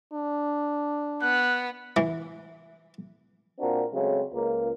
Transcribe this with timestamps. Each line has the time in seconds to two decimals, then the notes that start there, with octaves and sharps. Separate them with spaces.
0.13 D4
1.22 B3 F#6
1.97 E3
3.60 A#2 C4 D4 F#4 A#4
3.93 C#3 F#3 G#3 A3 C4 C#4
4.32 C#2 A#3